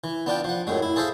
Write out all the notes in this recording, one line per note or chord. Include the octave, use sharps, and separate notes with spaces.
E3
B3 D4 F4 G5
F3 F#5
F#2 A2 G#3
E4
G#4 A4 C5 E5 F5